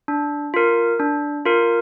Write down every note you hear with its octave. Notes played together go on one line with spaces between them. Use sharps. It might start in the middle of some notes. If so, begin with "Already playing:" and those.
D4
F4 A#4
D4
F4 A#4